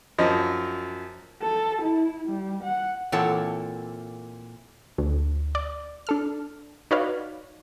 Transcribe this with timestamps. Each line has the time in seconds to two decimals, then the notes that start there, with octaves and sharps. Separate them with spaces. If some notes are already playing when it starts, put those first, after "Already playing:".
0.18 F#2 F3 D#5
1.43 A4
1.82 E4
2.28 G3
2.63 F#5
3.12 A#2 E3 C4 A4 C#5 F#5
4.98 D2
5.55 D5
6.07 D4 A4 F6
6.91 D#4 F#4 B4 C#5 D5 F5